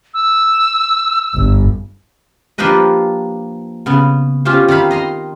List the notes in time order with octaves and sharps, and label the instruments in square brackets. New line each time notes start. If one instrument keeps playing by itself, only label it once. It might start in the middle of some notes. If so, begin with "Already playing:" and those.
[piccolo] E6
[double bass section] G1
[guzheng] F3 A#3 D4 G4 B4 D#5
C#3 B3
C#4 F4 G4 C5
D#3 A4 F5 B5
D#5 A#5 C6